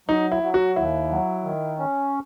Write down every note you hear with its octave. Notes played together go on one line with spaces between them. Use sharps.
F#3 D#4
E4
F#3
F#4
D#2 E4
F#3
D#3
C#4